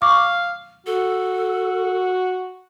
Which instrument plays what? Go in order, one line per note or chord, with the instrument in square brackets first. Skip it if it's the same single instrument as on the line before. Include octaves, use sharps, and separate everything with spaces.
[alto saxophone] F5 [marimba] C#6 D6
[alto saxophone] F#4 [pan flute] A4